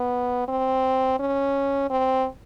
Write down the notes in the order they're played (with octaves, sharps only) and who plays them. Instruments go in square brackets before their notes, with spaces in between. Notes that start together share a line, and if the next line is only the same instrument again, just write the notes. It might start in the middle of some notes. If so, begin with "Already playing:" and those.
Already playing: [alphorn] B3
C4
C#4
C4